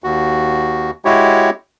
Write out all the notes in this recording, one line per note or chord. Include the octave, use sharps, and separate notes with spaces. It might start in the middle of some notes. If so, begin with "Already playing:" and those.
D#2 F#4
G#3 E4 F#4 G4 C#5